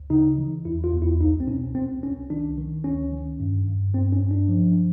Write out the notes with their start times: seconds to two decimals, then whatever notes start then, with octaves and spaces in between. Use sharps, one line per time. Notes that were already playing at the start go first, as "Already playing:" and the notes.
Already playing: D2
0.10 C#3 D#4
0.38 E3
0.65 E2 E4
0.84 F4
0.93 E2
1.02 E4
1.20 C2 D#4
1.40 C4
1.47 B2 C#4
1.75 C2 C4
2.03 C2 C#4
2.30 D#3 D4
2.57 D#3
2.84 D2 C#4
3.12 D#3
3.40 G2
3.67 G2
3.94 G2 C4
4.13 C#4
4.22 G2
4.31 D4
4.49 F3
4.77 F3